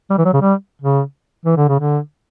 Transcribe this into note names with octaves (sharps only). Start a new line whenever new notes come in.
G3
E3
F#3
C#3
G3
C#3
E3
D3
C#3
D3